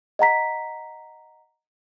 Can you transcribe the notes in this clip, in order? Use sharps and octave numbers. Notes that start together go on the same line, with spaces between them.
D#5 F#5 A#5 B6